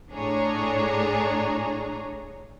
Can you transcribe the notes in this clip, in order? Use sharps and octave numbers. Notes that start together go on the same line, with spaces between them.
A2 D4 G#4 C#5 A#5